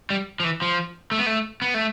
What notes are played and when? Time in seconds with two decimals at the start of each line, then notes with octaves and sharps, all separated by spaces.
0.10 G3
0.40 F3
0.44 E3
0.62 F3
1.11 A3
1.19 B3
1.26 A3
1.62 B3
1.74 A3